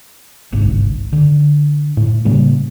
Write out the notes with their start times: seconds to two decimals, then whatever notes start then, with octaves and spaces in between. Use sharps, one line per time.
0.53 G1 C2 G#2
1.13 D3
1.97 A2
2.25 A2 C#3 G3 A#3